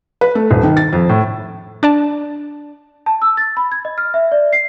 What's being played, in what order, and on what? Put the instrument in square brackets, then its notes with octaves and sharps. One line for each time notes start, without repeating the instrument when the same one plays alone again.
[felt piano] B4
A3
D#1
D#3
A6
F2
A2
[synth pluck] D4 D5 A5
[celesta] A5
E6
A6
B5
G#6
D#5
F6
E5
D5
C7